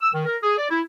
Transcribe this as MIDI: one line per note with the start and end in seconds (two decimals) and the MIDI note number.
0.01 0.11 88
0.13 0.23 51
0.26 0.37 70
0.42 0.56 68
0.58 0.67 74
0.69 0.80 64